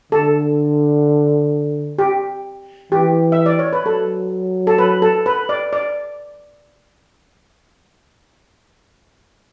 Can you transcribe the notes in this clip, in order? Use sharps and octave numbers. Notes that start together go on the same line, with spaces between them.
D3 A4
G4
E3 G4
E5
D5
C#5
B4
F#3 A4
A4
B4
A4
B4
D5
D5